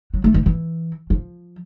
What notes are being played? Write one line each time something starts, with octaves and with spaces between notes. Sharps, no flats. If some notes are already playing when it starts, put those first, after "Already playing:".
F#3
A3
E3
E3
F3